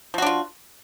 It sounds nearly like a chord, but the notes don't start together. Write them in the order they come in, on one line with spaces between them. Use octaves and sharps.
F3 F#4 D4 F4